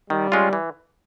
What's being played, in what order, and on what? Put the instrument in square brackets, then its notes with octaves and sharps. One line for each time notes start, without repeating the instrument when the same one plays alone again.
[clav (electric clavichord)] D#3 [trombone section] G3
[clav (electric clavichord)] G#3 C#4 F4
E3